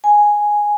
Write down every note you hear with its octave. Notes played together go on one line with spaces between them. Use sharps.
G#5